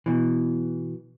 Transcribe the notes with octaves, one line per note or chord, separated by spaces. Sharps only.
B2 E3